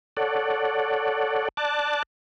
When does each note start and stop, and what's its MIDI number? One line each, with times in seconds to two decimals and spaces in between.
0.17 1.49 69
0.17 1.49 73
0.17 1.49 74
0.17 1.49 78
1.57 2.03 74
1.57 2.03 81
1.57 2.03 90